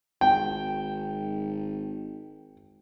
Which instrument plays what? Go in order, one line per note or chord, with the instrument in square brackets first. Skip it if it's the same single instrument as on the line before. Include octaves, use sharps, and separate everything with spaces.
[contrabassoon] G#1 [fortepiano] G5